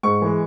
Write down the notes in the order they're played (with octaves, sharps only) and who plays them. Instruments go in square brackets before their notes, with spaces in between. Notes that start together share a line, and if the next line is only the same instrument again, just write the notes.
[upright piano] G#2 C#6
E3 G#3